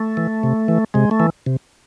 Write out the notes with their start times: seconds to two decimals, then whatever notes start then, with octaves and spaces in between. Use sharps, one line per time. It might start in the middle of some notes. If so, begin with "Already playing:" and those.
Already playing: A3
0.17 E3
0.43 C3
0.68 E3
0.94 C3 G#3
1.11 A3
1.20 E3
1.46 C3